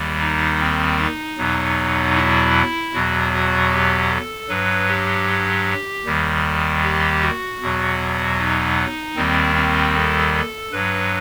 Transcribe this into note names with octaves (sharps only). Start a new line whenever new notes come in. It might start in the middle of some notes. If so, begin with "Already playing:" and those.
Already playing: D#2 D#3 G3
D#4
C4
D#4
E2 B2 F#3
E4
E2 B2 F#3 F#4
F#4
G4
A4
G2 F#3 B4
G4
D#2 D#3 G3
G4
F#4
E2 B2 F#3
D#4
D#2 D#3 G3 C4
C4
A4
A4
G2 F#3 B4